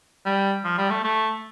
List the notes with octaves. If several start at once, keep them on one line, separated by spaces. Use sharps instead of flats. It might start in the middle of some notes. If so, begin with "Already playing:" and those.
G3
F3
G3
A3
A3